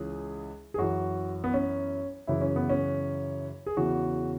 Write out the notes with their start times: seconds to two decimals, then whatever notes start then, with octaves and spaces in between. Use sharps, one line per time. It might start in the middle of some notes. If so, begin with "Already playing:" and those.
Already playing: C#2 C#3 E3 G#4
0.74 G#4
0.78 F#2 E3 F#4
1.44 B3
1.54 C#4
2.27 F#2 C#3 E3 E4
2.41 C#4
2.56 B3
2.70 C#4
3.66 G#4
3.77 E2 C#3 E3 F#4